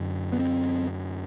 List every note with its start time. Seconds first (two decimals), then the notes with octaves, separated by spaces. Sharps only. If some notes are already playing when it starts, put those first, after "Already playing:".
Already playing: F#2 D3
0.32 B3
0.39 C4